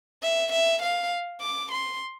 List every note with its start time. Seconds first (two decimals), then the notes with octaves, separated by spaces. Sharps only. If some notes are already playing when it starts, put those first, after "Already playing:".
0.22 E5
0.52 E5
0.82 F5
1.41 D6
1.71 C6